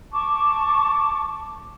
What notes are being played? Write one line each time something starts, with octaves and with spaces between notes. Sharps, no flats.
A5 C#6 D6